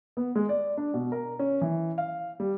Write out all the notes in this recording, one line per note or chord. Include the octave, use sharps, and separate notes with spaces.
B3
G#3
D5
D4
B2
A#4
C#4
E3
F5
G3